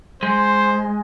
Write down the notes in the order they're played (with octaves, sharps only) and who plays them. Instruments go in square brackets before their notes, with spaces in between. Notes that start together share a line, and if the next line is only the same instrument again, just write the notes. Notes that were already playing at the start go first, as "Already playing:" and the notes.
[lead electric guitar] G#3 [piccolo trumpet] C5